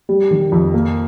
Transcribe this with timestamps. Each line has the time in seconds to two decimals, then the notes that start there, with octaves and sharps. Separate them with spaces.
0.09 G3
0.31 D#3
0.52 F2
0.74 A#3